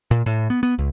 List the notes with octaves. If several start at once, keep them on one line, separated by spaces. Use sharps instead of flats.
A#2
A2
B3
B3
C#2